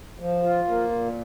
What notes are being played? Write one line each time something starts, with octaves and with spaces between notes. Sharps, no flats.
F3
F4
A#3
A#2